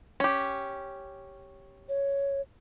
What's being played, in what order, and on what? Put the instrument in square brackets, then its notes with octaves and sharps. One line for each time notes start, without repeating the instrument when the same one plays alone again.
[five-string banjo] C#4 G4
[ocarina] C#5